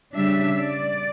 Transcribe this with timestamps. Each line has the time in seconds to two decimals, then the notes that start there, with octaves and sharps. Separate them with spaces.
0.15 C#3 G3 D4 E5
0.57 D5